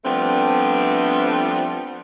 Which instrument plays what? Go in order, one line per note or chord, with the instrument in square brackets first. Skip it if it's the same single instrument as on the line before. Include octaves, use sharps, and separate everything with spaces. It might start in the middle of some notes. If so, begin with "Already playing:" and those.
[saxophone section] F3 G3 A3 B3 C4 D4